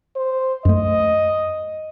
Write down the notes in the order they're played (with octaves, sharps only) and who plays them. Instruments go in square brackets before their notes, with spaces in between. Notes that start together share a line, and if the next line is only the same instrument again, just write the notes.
[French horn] C5
[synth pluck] F#2 A3 [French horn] D#5